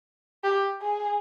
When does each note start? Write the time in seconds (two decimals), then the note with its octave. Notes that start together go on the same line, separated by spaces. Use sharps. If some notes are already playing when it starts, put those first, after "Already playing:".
0.44 G4
0.81 G#4